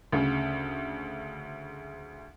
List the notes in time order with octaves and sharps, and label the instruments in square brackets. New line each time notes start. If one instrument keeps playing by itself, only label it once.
[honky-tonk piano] D2 C#3